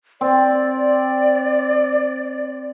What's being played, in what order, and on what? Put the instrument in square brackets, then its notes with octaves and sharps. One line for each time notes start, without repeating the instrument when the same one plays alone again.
[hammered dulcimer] C4 [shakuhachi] D5